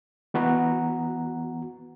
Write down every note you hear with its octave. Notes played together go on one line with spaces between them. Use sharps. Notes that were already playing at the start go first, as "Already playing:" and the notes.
E3 B3 F#4 F#5 A#5